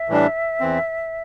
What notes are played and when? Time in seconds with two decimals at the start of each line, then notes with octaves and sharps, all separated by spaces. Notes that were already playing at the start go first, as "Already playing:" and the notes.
Already playing: E5
0.09 A2 E3 G3 D4
0.60 E2 E3 C4